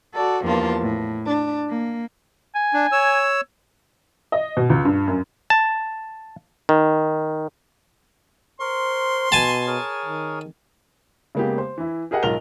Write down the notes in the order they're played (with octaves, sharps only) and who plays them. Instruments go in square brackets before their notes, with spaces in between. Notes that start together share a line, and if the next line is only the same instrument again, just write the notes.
[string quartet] F#4 A4 D5
E2 G2 F3 A#3 F4 A5
A2
D4
A#3
[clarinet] G#5
[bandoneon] D4
C#5 E6
[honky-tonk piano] D#5
B2
C#2
G2
F#2
[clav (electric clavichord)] A5
D#3
[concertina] A#4 C#6 [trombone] C5 [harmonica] C6
[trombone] B2 [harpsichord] G#5 A5
[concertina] G#4 A#4 C#5
[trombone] D#3
[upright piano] C#3 G#3 A#3 B3 G4
C5
E3 E4
G4 G#4 A#4 D#5 F#5
B1 G#2 F4 A#4 F7 G7